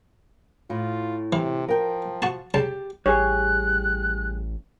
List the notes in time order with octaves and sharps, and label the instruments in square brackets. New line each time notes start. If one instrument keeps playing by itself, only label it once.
[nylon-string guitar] A2 [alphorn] F4
[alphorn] C3 [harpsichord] E3
[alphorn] F3 [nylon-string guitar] A#4 G5
[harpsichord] F#4 A5
[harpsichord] C#2 A5 [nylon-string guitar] G4
[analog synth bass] A1 [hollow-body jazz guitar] G3 G4 G#4 [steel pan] C#5 [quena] F#6